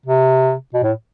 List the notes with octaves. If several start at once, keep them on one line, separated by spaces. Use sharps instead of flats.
C3
B2
A2